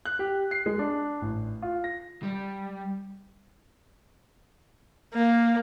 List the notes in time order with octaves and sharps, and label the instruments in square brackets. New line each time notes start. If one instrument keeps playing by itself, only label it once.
[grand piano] F#6
G4
C7
G#3
D4
A1
F4
A#6
[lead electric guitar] G3
[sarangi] A#3